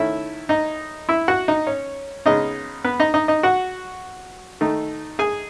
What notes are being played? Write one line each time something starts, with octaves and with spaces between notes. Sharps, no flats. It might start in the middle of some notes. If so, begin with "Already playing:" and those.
Already playing: D#3 A3 C#4 E4 E5
D#4 D#5
E4 E5
F#4 F#5
D#4 D#5
C#4 C#5
C#3 G#3 B3 D#4 D#5
B3 B4
D#4 D#5
D#4 D#5
D#4 D#5
F#4 F#5
D#3 A3 D#4
G#4 G#5